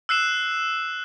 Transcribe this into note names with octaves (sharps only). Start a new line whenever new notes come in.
E6 F#6 C7 E7